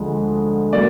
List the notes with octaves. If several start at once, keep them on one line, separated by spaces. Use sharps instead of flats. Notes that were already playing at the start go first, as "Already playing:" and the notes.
Already playing: D2 D3 F3 G#3
F#3 A#3 D5